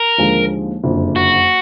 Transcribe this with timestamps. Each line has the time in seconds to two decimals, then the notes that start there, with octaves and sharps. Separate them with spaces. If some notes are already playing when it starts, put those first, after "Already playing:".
Already playing: A#4
0.18 D#2 D3 F3 G#3
0.83 F#1 F2 D3
1.16 F#4